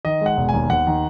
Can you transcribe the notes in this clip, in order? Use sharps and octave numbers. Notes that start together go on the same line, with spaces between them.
D#3 D#5
G#3 F#5
E1
D#2 G#5
D#2 F#5
D#3